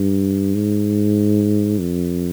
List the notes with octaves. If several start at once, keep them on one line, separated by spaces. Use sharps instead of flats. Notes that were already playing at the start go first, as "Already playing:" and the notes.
Already playing: G2
G#2
F2